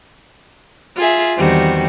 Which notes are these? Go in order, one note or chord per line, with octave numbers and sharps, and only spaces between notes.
F4 G#4 E5
E2 D#3 G3 C4 F#4